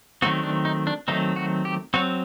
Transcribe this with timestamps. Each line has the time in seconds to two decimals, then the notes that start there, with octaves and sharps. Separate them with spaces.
0.22 D#3 F#3 A3 C4 F#4
0.43 D4
0.65 D#4
0.87 D4
1.08 D#3 F#3 A3 C4 D#4
1.36 F#4
1.65 G4
1.94 F#3 C4 F#4